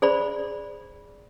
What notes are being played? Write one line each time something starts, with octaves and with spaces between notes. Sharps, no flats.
G#4 C5 D5 B5